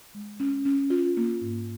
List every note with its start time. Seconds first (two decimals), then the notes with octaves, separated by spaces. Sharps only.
0.14 G#3
0.40 C#4
0.66 C#4
0.90 F4
1.17 A#3
1.41 G#2